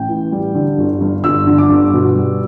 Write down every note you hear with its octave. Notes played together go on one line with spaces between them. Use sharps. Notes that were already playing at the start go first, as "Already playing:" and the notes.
Already playing: A1 G5
E3
G3
D3
G1
G2
G1 E6
D3
D6
G1
B2
G3